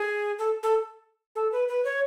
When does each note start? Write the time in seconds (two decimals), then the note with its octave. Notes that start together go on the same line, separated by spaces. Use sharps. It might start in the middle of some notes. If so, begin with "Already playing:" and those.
Already playing: G#4
0.38 A4
0.63 A4
1.35 A4
1.52 B4
1.68 B4
1.85 C#5